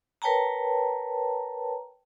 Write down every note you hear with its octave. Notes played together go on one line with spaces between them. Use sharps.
A#4 B4 C#5 G5 A5 A#5